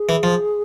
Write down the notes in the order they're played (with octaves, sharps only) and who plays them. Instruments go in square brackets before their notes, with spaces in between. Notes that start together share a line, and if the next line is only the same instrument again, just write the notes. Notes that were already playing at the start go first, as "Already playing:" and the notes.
Already playing: [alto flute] G#4
[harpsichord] E3
F3